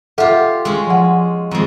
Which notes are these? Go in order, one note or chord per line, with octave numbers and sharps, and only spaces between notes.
F4 G4 A4 E5 F#5
G#3 C#4
F3 F#5
F2 G#3